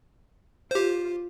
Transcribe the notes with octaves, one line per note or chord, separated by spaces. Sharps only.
F4 G4 C5